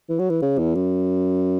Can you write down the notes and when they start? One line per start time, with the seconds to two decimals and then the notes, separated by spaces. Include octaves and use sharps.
0.09 E3
0.19 F#3
0.30 E3
0.42 C#3
0.58 E2
0.75 F#2